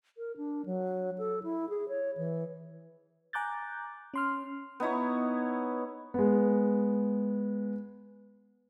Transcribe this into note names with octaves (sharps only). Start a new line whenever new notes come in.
A#4
D4
F#3
A4
E4
G#4
C#5
E3
G#5 A#5 D6 F#6 G6 A6
C#4 C6 F6
B3 D#4 E4 C#5
G#3 B3